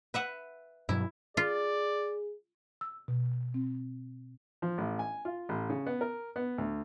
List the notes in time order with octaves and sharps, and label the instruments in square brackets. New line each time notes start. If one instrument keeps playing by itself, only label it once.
[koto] B4 E5 F#5
[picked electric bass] G2 B2 F#3 [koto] E4
[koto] F4 [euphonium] G#4 [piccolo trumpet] D5
[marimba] E6
B2
C4
[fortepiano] F3
A1
G#5
F4
A1
C#3
B3
A#4
B3
D2